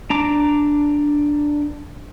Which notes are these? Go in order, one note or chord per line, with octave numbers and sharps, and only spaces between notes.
D4 A#5 D6